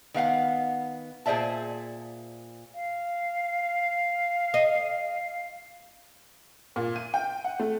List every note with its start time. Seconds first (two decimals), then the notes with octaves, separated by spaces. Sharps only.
0.14 D#3 B3 F5 F#5
1.26 A#2 G#4 C5 D5 E5 A5
2.75 F5
4.54 D#5
6.76 A#2
6.96 D#7
7.14 G5
7.44 F#5
7.60 A3